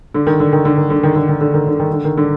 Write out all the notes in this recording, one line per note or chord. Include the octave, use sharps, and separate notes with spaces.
D3
D#3
D3
D#3
D3
D#3
D3
D#3
D3
D#3
D3
D#3
D3
D#3
D3
D#3
D3